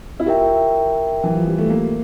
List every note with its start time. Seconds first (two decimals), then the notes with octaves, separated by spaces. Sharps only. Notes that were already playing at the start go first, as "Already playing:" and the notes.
0.20 E4
0.26 F4 G4 A#4 E5 G5
1.24 E3
1.35 F3
1.47 G3
1.58 A3
1.70 A#3